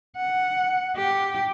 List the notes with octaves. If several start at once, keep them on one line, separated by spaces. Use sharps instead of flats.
F#5
G4